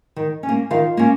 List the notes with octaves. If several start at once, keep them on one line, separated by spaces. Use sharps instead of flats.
D#3
C#4
A#3
D#3 F4 F5
A#3 C#4